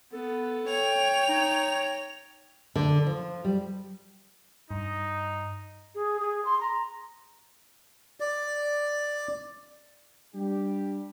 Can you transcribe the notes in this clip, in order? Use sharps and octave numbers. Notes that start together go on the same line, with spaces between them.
B3 A4
C#5 G5 F7
D#4
D3
F3
G3
G2 D#4
G#4
G#4
C6
A#5
D5
G3 D4 G4